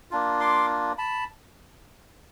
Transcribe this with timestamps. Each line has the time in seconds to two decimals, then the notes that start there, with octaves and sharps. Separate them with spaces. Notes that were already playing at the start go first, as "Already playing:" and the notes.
0.11 A#3 D4 F4
0.40 C6 D6
0.98 A5 B5